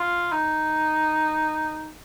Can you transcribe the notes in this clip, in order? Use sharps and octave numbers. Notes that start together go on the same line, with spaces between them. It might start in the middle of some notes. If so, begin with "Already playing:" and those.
Already playing: F4
D#4